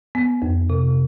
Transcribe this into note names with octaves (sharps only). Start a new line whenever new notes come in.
B3
F2
C3